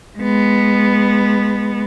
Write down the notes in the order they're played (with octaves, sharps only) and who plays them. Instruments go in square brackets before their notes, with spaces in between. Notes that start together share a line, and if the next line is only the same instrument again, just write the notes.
[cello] G#3 B3